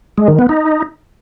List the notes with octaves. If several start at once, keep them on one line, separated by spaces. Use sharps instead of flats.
G#3
D#3
B3
D#4